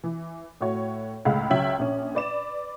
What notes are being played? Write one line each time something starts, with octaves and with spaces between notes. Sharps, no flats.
E3
A2 F#4 C#5
C#2 A2 G#3 F5 F#5 B5
C#2 F#3 C#4 E5 G5 F#7
A#1 C#4
B4 D5 E7